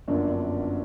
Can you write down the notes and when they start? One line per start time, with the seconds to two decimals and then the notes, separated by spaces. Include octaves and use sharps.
0.08 G1 F#2 D3 F3 A#3 D4
0.28 D4